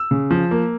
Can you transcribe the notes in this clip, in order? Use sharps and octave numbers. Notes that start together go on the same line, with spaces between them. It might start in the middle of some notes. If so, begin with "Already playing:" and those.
Already playing: E6
C#3
F3
A#3